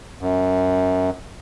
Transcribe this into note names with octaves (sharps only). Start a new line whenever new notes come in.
F#2